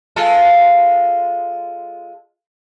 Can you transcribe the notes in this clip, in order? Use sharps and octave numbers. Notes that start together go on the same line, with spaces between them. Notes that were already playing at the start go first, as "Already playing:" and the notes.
G#3 F4 A4